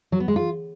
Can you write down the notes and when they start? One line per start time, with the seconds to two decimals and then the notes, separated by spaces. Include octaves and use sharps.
0.12 F#3
0.20 B3
0.28 G#3
0.36 F4